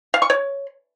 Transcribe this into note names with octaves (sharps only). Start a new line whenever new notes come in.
F5
C#6
C#5